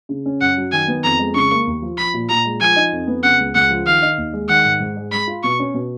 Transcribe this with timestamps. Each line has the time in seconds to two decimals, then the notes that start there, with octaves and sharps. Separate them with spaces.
0.09 C#3
0.26 C#4
0.41 F#2 F#5
0.57 F#3
0.72 D#3 G#5
0.88 B3
1.04 F2 A#5
1.19 G#3
1.35 C#3 C#6
1.52 A#3
1.67 D#2
1.82 F3
1.98 F3 B5
2.14 A#2
2.29 A#2 A#5
2.45 G#3
2.61 F3 G#5
2.76 D#4
2.92 F2
3.07 B3
3.24 C#3 F#5
3.40 C#2
3.55 C#2 F#5
3.70 F3
3.86 D#3 F5
4.02 D#4
4.18 D#2
4.33 G#3
4.49 D#3 F#5
4.65 G#2
4.80 G#2
4.97 G#3
5.12 G#3 B5
5.28 F4
5.43 B2 C#6
5.60 C#4
5.74 B2